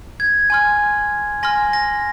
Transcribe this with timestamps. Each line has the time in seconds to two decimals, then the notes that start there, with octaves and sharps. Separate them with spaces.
0.20 G#6
0.50 G#5 C6 F6
1.43 G#5 C6 F6 A#6
1.73 A#6